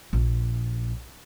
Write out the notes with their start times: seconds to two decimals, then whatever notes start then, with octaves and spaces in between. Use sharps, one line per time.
0.13 A#1